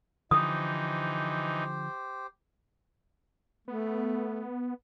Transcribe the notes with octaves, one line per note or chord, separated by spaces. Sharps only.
D3 E3 F3 D#4 G4 C5 D#6
A3 B3